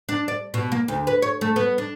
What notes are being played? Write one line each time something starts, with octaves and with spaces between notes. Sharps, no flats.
D4
D5
B2
A#3
D2
B4
C#5
A3
B3
D4